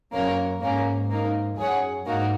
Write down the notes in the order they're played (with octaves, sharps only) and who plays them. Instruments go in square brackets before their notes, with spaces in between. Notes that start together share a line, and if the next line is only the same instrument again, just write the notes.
[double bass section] F#2 [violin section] A#3 C#4 A#4 C#5
[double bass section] G#2 [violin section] A#3 C#4 A#4
[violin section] A#3 D#4 A#4
[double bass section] F#2 [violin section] G#4 C#5 F#5
[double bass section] G#2 [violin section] A#3 D#4 F#4 A#4